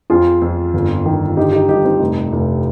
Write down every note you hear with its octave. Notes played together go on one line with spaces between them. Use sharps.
F2 F4 G#4
F2
G1
D#3
D3 D#4 G4
D#4 G4
G2 D#4 G4
C4 D#4
F1
F1